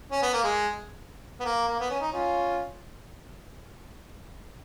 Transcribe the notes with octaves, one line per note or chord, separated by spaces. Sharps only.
C#4
B3
A#3
G#3
B3
A#3
A#3
B3
C#4
D#4
C#4 F4